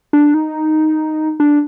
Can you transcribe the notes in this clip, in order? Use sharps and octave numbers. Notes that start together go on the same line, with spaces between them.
D4
D#4
D4